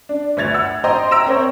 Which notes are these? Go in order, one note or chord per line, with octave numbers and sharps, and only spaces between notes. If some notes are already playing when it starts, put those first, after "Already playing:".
D4
G1 D2 G#6 A6 F7
F#5 E6
C5 D#5 G5 A#5 C6 D#6
E5 A#5 E6 A#6 D7 E7
C4 A#4 C5 C#5